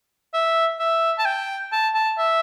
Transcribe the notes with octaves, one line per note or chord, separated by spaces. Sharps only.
E5
E5
A5
G5
A5
A5
E5